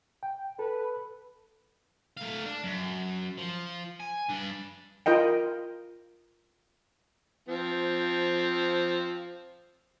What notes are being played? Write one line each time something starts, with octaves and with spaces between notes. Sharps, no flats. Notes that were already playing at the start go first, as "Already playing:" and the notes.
G5
A4 B4
A3 F5
D4
F#2
F3
G#5
G2 D4
F4 A#4 D#5 G5
F3 C4